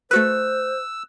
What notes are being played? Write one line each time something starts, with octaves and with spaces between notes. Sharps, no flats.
A3 F#4 B4 C5 E6 F#6